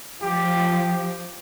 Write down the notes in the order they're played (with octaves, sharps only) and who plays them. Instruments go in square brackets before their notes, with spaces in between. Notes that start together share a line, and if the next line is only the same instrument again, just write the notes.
[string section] F3 [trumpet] G4